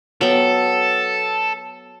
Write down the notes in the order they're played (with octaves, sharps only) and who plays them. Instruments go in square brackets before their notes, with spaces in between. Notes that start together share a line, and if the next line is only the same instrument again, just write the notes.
[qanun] F#3 B3 G5 [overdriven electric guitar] A4